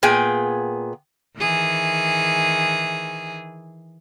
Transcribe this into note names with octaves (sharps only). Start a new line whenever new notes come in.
A#2 B3 G#4 G5 G#5
D#3 E3 G#4